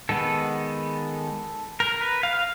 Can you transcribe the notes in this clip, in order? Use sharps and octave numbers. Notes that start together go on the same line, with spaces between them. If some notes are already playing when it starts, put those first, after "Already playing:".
D#3 G#3 B3 A4
A#4
B4
F5